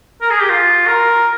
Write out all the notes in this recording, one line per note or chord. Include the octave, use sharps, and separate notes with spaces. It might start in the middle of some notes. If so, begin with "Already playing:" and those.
A#4
G#4
G4
F4
A#4